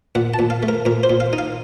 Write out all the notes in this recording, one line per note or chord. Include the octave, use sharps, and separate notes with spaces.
A#2 F#5
A5
A#2
F5
A3
A#4
A#2 A#4
C5
A#2
F5
D#4
F5